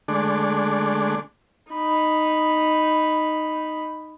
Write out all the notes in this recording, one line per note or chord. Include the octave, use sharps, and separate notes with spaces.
D3 G#3 A3 D4
D#4 B5